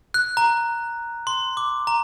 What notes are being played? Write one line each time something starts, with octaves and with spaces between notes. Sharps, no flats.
F#6
A#5
C6
D6
A#5